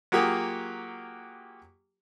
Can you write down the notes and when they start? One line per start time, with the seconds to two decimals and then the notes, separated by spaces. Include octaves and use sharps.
0.12 F#3 A#3 F4 G4 G#4